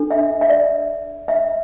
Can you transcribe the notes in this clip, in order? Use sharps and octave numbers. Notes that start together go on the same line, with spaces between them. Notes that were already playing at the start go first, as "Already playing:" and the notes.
Already playing: D4 A4
E5
E5
D5
E5